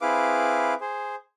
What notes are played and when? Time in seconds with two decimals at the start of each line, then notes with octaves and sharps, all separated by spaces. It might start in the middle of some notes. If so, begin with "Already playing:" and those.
0.01 C4 E4 G#4 B4 F5 D6
0.81 G#4 C5